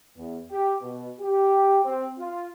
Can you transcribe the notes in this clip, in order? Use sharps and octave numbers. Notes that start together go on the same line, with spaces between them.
E2
G4
B2
G4
C4
F4